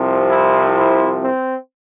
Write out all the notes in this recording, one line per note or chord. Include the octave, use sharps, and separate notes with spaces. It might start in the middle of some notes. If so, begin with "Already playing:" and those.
Already playing: C2 C3 F3
E4
E4
C4